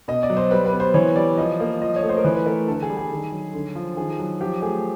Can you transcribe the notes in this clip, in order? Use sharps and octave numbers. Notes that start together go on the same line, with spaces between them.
B2 D#5
D5
F#3
C5
G3 B4
B4
B3
C5
E3 C#5
G3 D5
F3 D#5
A#3
F3 D#5
C#5
A3
C5
A#4
E3 B4
B4
A3 A#4
D3 A4
G#4
G3
G#4
D#3
F#3
D3
F3
D#3 G#4
F#3
F3 G4
A3 G#4